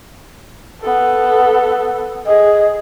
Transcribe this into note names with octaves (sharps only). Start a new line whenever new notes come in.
B3 A4
G#4 D#5